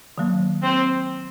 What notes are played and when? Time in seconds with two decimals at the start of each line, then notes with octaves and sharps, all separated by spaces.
0.18 D#3 F#3 A#3
0.62 C4 C5